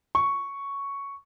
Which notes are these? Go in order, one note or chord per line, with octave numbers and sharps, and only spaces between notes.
C#6